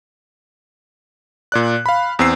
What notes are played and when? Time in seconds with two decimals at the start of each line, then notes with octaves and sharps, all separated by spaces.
1.52 A#2 D5 F#6
1.86 F5 B5
2.19 E2 C4 E6 C7